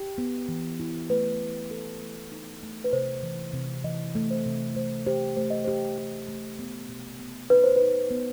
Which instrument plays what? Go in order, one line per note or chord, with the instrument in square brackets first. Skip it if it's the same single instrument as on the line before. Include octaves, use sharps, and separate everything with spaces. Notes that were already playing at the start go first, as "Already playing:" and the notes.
Already playing: [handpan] G4
B3
E3
E4
[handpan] A3 [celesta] B4
[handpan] A3
A4
A3
D#4
A3
[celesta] B4
[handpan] C3 [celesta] C5
[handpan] E3
C3
[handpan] E3 [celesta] D#5
[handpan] A3
[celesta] C5
[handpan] C3
[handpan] A3 [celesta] C5
[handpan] G4 [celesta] C5
[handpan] A3 [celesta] C5
[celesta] D#5
[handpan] G4 [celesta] C5
[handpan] G4
A3
B3
B2
B3
[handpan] D#4 [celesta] B4
[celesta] C5
[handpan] D#4 [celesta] B4
[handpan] B3